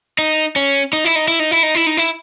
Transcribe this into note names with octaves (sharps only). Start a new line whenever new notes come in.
D#4
C#4
D#4
E4
D#4
E4
D#4
E4
D#4
E4
D#4
E4